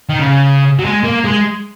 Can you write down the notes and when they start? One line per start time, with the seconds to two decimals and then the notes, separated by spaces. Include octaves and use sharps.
0.09 D#3
0.20 C#3
0.79 F#3
0.83 G#3
1.03 A#3
1.24 G#3